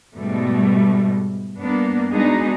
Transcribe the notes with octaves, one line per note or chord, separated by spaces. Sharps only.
G#2 B2 G3 A3
G2 A#3 B3 D4
G#3 B3 D4 D#4 F#4 G#4